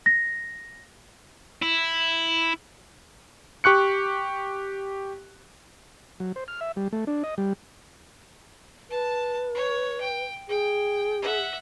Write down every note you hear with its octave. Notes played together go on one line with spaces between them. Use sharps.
A#6
E4
G4 C#6 F#6 C#7
F#3
C5
F6
E5
G3
A3
D4
D#5
G3
B4 A5
C#5
G5
G#4 G5
E5 F#5